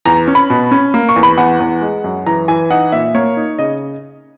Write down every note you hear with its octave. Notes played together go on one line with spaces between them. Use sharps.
E2 A#5
C#4
B5
B2
C#4
A#3
C#6
E2
B5
E2 F#5
E2
G#3
F#2
E3 A#5
E3 G#5
D#4 F#5
A#2 E5
A#3 C#5
D#4
C#3 D#5